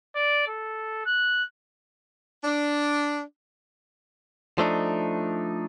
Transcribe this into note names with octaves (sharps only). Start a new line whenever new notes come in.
D5
A4
F#6
D4
F3 A3 D4 D#4